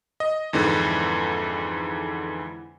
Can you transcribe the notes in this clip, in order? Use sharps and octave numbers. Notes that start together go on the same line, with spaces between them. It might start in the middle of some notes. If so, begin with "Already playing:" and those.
D#5
F2 G#2 D3 E3